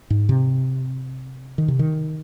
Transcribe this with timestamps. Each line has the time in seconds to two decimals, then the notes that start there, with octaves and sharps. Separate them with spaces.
0.10 G#2
0.29 C3
1.58 D#3
1.68 C3
1.79 D#3